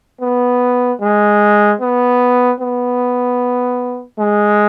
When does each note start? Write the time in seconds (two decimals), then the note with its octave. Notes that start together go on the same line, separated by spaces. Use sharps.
0.21 B3
1.01 G#3
1.81 B3
2.60 B3
4.19 G#3